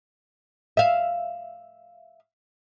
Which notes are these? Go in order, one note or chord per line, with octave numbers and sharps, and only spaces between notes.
E5 F5